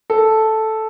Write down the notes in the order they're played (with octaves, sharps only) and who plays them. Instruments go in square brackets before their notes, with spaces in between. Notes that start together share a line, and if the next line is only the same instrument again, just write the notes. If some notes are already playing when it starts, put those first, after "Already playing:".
[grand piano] A4